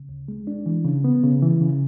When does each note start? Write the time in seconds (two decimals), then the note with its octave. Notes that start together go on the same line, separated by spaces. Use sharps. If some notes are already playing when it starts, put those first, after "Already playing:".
Already playing: C#3
0.09 D2
0.28 G#3
0.47 D4
0.66 E3
0.85 C#3
1.04 B3
1.24 C#3
1.42 E3
1.61 C#3